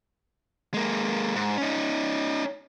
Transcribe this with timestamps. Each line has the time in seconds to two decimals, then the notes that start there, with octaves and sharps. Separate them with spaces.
0.74 G#3 A#3
1.36 G#2
1.58 C#4 D#4